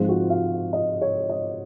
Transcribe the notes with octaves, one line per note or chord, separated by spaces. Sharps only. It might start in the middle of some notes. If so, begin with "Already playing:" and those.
Already playing: G#2 F3 G#3 C4 F4
F#4
F5
D#5
C#5
D#5